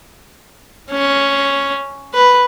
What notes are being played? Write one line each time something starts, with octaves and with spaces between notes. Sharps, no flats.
C#4
B4